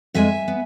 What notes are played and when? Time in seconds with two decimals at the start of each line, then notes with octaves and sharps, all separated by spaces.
0.14 F2 E3 G#3 E5 G#5
0.48 B3